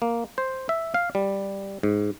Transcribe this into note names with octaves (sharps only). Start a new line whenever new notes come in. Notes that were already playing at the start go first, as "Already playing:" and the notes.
A#3
C5
E5
F5
G3
G#2